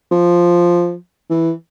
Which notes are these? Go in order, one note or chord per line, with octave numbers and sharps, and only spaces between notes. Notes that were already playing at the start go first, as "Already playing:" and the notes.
F3
E3